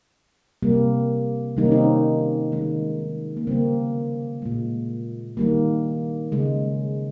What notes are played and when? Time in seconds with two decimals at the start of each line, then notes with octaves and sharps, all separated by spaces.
0.63 C3 G3 A#3
1.57 C3 D#3 G3 A#3 D#4
1.64 C#4
1.72 C4 D#4
2.52 D#3 G#3
3.37 A#3
3.47 C#3 G3 A#3 C4
4.42 A#2 G#3
5.37 D#3 G3 A#3
6.32 C#3 G#3